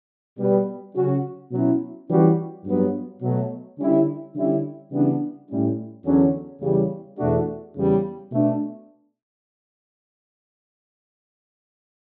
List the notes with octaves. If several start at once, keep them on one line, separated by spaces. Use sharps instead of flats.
B2 G3 B3
C#3 F#3 C#4 F#4
B2 F#3 C#4 E4
E3 G3 C#4 F#4
G2 F#3 B3
B2 F#3 A3
D3 G3 C#4 E4
D3 G3 C#4 E4
C#3 E3 G3 B3 D4
A2 G3 C#4 E4
E2 D3 F#3 C#4
E2 C#3 G3
E2 B2 A3 D4 F#4
E2 C#3 G3 B3
B2 A3 D4